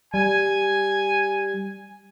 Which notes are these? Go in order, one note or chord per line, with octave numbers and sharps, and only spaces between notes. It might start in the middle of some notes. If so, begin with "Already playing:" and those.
G3 G#5